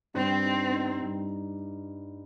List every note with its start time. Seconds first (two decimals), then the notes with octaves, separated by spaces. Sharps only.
0.14 G2 C4
0.44 D#4
0.72 D#4
1.01 G2